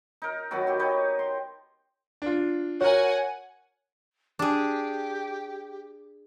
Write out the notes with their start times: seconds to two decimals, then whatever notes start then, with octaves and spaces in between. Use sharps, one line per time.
0.22 D#4 A#4
0.51 D#3 F#3 B3 F#4
0.67 E4 G4
0.79 D#4 G4 B4 C#5
1.19 C6
2.22 D4 F4
2.81 F#4 A#4 C#5 F#5 G#5
4.39 D4 G4 G#4